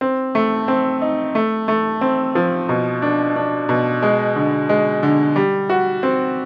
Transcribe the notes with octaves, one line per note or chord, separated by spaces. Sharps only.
C4
A3
C4
D#4
A3
A3
C4
F3
B2
D4
D4
B2
G#3
D3
G#3
D3
G3
F#4
C4